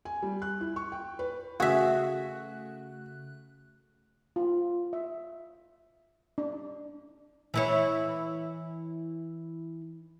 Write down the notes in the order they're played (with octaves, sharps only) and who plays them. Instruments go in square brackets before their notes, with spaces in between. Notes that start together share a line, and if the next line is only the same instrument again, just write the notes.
[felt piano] G#5
G3
F#6
E4
C#6
G5
B4
[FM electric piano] C#3 A3 F#6 [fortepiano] F#4 [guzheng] G#4 E5
[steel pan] F4
E5
D4
[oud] E3 E4 C#5